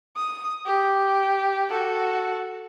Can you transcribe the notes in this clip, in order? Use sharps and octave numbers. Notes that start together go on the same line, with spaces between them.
D#6
G4
F#4 A4